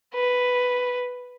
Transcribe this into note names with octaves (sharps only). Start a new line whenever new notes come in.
B4